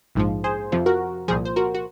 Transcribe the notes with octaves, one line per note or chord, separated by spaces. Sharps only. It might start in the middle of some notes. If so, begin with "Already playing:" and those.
A#1 G#2 F3
G#4 C5
F2 C3 F3
F#4 A#4
C2 A#2 F3 G#4 C5
C5
F#4 A#4
F#4